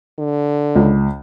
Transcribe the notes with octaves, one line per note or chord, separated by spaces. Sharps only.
D3
C#2